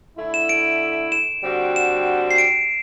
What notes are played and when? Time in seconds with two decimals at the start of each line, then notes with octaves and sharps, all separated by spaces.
0.18 D3 A3 E4
0.34 E7
0.49 D7
1.12 E7
1.44 D3 G3 C4 F#4
1.76 E7
2.31 C7
2.38 D7